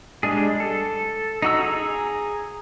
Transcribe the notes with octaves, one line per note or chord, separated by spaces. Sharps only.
G3 G#3 D4 G#4
A4
D#4 F#4 E6
G#4 A#5